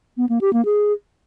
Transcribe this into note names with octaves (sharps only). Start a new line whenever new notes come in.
B3
A#3
G4
A#3
G#4